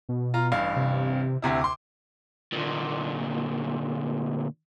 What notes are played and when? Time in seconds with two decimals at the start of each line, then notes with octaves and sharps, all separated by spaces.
0.09 B2
0.34 F4 A#5
0.52 A1 G2 F5
0.76 C3
1.42 D2 C3 E4
1.61 C6 D6
2.53 D2 A#2